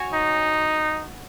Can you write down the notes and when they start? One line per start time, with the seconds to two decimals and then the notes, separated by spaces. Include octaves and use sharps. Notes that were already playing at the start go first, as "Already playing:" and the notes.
Already playing: F#4 C#5 G#5
0.14 D#4